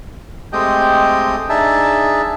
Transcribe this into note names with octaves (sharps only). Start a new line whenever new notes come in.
G#3 A3 C4 G4 D#5 G5
D4 D#4 G#4 E5 A5